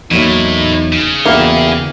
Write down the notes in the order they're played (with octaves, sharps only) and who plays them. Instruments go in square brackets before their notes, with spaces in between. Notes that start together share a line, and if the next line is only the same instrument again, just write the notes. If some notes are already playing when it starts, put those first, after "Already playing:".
[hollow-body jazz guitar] E2 F#3 A#3 [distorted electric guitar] A2 [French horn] D#4
[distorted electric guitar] C#3
[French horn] E2 [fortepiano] A#3 [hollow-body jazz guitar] E4 F#4 G4